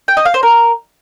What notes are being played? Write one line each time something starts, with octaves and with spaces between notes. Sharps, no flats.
G5
D#5
F5
C5
A#4